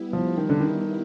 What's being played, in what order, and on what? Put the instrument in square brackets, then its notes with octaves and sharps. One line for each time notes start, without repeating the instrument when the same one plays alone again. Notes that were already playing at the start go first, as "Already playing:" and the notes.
Already playing: [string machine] G3 B3 E4
[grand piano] F3
D#3
D3
D#3